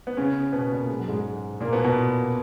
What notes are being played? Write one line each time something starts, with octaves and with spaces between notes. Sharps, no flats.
B3
C#3 C#4
B2 B3
A#2 A#3
G#3
F#3
G#2 G#3
A#2 A#3
B2 B3
B2 B3